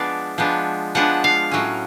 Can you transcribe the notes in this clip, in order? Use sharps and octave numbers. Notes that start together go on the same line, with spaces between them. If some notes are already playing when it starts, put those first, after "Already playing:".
Already playing: F3 G#3 B3 D4 D5 F5
F3 G#3 B3 D4
F3 G#3 B3 D4 F#5
F5
A2 F#3 C#4